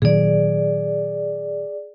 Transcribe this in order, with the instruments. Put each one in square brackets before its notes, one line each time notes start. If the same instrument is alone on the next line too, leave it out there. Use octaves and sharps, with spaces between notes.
[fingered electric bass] A#2 D#3 F#3 [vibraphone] G#4 D5